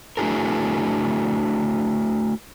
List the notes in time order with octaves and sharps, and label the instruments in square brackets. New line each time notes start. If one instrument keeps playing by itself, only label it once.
[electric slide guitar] A3 D4 E4 F#4 G#4 A#4